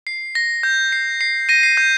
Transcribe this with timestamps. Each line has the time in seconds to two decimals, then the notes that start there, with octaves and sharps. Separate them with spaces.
0.07 C7
0.35 A#6
0.63 G6
0.92 C7
1.21 C7
1.49 A#6 D#7
1.63 C7
1.77 G6